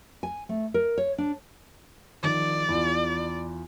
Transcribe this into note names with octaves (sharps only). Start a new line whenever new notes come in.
G#5
A3
A#4
C#5
D4
D#3 F3 D5
E2 F4